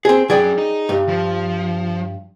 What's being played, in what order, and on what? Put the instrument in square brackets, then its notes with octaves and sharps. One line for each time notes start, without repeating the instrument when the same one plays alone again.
[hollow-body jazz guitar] C4 G#4
[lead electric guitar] F#3 C#4 [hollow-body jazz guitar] G#4 D5 G5
[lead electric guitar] D#4 D#5
[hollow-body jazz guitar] G2
[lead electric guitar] F3